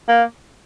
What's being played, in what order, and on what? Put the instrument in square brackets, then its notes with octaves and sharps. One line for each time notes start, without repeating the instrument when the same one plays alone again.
[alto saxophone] A#3